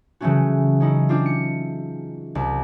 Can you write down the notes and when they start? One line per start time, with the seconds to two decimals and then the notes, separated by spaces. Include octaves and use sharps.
0.20 C#3 E3 F#3 A3 C#4 F#4
0.80 C#4 D#4 E4
1.09 C4 D4 F4
1.26 C#7
2.35 C2